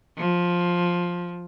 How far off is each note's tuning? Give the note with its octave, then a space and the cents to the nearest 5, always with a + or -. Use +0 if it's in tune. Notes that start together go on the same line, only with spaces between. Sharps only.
F3 +10